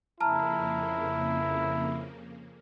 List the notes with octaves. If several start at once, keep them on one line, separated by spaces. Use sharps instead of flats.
F2 C#3 A#3 E4 A5 A#5 F6